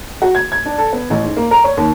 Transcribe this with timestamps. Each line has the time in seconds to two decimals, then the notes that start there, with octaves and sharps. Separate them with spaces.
0.22 F#4
0.35 G#6
0.52 G#6
0.65 D4
0.78 A4
0.93 B3
1.10 A1
1.24 G#2
1.37 A#3
1.51 A#4
1.64 C#5
1.77 D#2